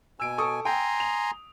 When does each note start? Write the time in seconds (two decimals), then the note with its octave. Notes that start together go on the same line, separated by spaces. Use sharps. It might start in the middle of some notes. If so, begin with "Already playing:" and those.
0.20 B2 G#5 E6 D7
0.38 A4 C#6 D#6
0.65 G5 G#5 A#5 C6
1.00 F7